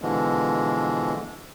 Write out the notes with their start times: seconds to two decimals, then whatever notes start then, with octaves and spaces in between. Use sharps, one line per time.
0.02 B2 D3 E3 F3 G#3